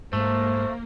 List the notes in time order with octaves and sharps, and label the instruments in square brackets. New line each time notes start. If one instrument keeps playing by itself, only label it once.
[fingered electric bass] G#2 [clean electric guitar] A3 [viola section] A#3 [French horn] C5